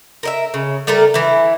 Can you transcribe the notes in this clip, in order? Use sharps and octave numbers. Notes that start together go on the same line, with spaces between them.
A#4 D#5 E5
C#3
G3 A3 A4 A#4
E3 E4